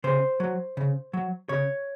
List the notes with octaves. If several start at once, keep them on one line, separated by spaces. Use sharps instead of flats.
C#3 C5
F#3
C#3
F#3
C#3 C#5